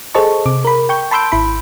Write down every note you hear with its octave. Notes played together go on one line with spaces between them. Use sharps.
G#4 A4 C5 D#5 A5 C#6
C3 D6
A#4 B5
G5 C#6 G6
A5 B5 C6 E6 G6 D7
G#1 E4 B5